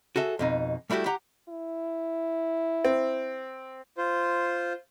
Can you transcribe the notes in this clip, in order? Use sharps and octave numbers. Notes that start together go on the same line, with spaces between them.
F#4 G#4 A4 E5
F2 B2 D#4
G3 A3 E4 F#4 G4
G4 F#5 A#5
E4
C4
F4 C5